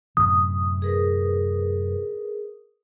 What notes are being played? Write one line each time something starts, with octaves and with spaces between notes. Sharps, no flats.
F#2 A2 C3 D#6
G#4 A#4 B4